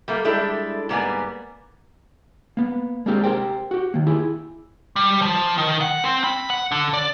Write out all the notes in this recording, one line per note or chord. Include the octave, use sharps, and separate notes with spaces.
G3 A3 A#3
G3 G#3 D4 E4 A4
G#2 G3 A#3 B3 D5 G#5
A#3 B3
G#3 A#3 C4 D4 G4 G#4
G4 A#4 C5 G5
F#4 G4
D#3 A#3
E4 G4 G#4
G3
F3
D#3
F#5
C4
B5
F#5
D3
D5